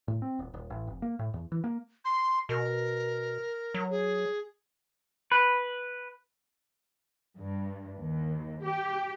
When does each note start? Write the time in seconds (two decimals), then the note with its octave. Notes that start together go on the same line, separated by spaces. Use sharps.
0.08 A2
0.22 C4
0.39 D#1
0.54 D#1
0.70 A1
0.87 F1
1.02 A#3
1.19 A2
1.34 E2
1.52 E3
1.64 A#3
2.05 C6
2.49 B2 A#4
3.74 F#3
3.90 G#4
5.32 B4
7.37 G2
7.98 D#2
8.64 G4